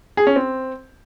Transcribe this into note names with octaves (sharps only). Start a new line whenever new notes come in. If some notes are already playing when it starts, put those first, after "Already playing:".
G#4
C#4
C4